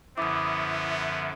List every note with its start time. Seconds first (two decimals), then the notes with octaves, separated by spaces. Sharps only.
0.18 F#2 D3 F3 B3 E4 D6 D#6